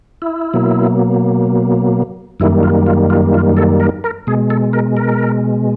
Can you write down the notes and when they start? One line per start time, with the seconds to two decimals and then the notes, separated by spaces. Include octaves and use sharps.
0.22 E4
0.54 B2 F#3 A#3
2.40 F#2 D#3 G3 A#3 E4
2.63 F4
2.87 F4
3.10 F4
3.34 F4
3.57 A4
3.80 A#4
4.04 A#4
4.27 B2 G#3 G#4
4.50 A4
4.73 A#4
4.97 A#4